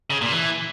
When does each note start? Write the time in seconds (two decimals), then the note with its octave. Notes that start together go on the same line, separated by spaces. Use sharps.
0.10 C#3
0.21 A#2
0.32 E3